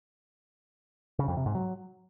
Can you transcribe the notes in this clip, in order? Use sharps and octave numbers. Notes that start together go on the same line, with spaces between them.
C#3
F2
C3
G#2
F#3